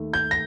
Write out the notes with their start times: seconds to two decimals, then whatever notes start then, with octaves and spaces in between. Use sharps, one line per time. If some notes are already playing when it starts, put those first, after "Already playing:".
Already playing: D#2 D#3 A3
0.13 G6
0.31 A#6